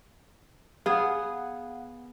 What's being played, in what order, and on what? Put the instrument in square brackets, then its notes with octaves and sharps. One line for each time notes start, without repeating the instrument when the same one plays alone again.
[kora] B3 G#4 [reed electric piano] F5 F#5